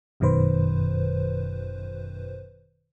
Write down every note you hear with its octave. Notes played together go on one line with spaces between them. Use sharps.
G1 F#2 B2 D#3 B4 C5